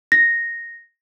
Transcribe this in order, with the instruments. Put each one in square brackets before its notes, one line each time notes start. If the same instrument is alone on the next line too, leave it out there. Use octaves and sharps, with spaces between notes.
[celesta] A#6